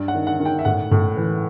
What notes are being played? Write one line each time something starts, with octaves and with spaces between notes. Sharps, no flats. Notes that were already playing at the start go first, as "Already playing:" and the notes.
Already playing: G2
F#5
D#3
F#5
D#3
G5
E5
A2 F#5
A2
E3